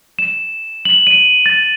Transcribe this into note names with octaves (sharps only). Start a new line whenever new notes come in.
E7
F#7
D#7
A6